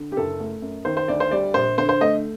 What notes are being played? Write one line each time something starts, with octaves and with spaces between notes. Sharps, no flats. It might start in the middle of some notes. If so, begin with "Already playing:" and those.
Already playing: D3
G4
F#1 A4
A3
F#2
D#3 C5
C5
D2 D5
C5
G3 D5
A#1 C5
D3 C5
C5
A3 D#5